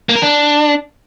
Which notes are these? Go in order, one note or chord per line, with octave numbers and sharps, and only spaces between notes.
A#3
A#4
D4